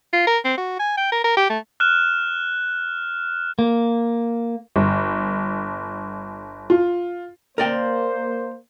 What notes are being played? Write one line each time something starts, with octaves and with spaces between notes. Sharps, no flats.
F4
A#4
C4
F#4
G#5
G5
A#4
A#4
G4
A3
F6 F#6 E7
A#3
G1
F4
A#3 A#4 C5 D5 G5